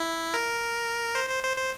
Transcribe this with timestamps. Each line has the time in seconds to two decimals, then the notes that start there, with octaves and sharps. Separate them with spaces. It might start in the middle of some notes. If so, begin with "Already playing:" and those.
Already playing: E4
0.34 A#4
1.15 C5
1.29 C5
1.43 C5
1.57 C5